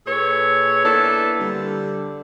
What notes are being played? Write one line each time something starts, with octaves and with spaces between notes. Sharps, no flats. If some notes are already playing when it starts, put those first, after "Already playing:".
A#2 G#4 A4 B4 C#5
A#3 B3 D4 E4 A4
D3 G3